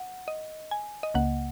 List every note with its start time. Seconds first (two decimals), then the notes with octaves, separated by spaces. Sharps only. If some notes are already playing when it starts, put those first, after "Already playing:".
Already playing: F#5
0.28 D#5
0.71 G#5
1.03 D#5
1.14 C#2 C#3 A#3 F#5